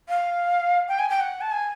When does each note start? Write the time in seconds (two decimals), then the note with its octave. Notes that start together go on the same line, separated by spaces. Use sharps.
0.08 F5
0.88 G5
0.98 G#5
1.09 G5
1.20 F#5
1.40 A5
1.51 G#5